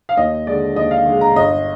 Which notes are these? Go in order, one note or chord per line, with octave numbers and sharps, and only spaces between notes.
F5
D#2 D#5
D3 G#3 D5
D#2 D#5
F5
D3 G#3
A#5
G1 D#5